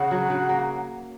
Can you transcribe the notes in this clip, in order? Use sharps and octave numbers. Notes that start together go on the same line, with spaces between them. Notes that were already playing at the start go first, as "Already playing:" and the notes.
Already playing: C#3 F#5
F#3
C#3
A#3